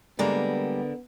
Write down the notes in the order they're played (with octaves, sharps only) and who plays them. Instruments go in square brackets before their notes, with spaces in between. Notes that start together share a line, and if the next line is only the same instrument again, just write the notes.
[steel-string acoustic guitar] D3 A#4 [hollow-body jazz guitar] G3 G#3 A#3 [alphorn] B3